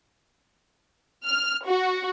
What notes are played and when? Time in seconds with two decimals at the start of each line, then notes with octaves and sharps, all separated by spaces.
1.24 F6
1.65 F#4